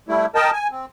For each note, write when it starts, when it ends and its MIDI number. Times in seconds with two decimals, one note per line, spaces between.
0.08 0.26 55
0.08 0.26 57
0.08 0.26 64
0.35 0.51 70
0.35 0.51 75
0.35 0.51 79
0.35 0.51 81
0.53 0.68 80
0.71 0.86 60